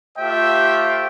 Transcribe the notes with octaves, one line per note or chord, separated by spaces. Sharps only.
A3 F4 G4 C5 E5 G5